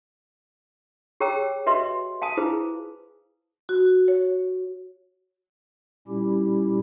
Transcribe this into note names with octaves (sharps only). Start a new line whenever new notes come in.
G4 G#4 C#5 G5 A#5 E6
F#4 G4 B4 D#5 E5 C6
F5 G#5 A5 D#6
E4 F4 G#4 B4 C5
F#4
C#5
A#2 G3 C#4 E4 G4